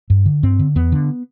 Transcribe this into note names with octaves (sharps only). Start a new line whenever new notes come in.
G2
D3
G2 C4
D3
E2 B3
D3